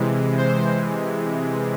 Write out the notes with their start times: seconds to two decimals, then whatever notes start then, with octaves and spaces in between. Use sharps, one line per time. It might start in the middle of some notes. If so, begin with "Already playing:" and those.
Already playing: C3 E3 G#3
0.38 C5